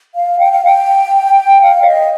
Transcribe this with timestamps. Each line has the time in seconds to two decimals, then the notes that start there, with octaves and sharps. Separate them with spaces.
0.15 F5
0.39 G5
0.52 F5
0.64 G5
1.62 F5
1.82 D5
1.86 D#5